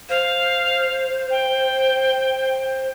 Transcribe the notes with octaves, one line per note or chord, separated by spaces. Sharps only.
C5 F5
G5